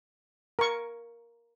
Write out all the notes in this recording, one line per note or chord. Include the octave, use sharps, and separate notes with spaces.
A#4 C#6